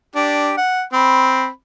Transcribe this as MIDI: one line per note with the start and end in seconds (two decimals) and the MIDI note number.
0.15 0.55 62
0.15 0.55 67
0.57 0.83 78
0.93 1.48 60
0.93 1.48 83